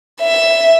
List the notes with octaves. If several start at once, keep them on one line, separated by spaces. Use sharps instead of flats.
E5